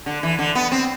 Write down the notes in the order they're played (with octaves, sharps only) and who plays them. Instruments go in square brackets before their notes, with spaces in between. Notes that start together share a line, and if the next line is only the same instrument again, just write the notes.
[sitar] D3
E3
D3
B3
C4